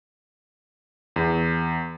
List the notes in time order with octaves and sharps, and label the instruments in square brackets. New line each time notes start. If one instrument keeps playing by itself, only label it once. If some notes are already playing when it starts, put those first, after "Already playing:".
[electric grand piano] E2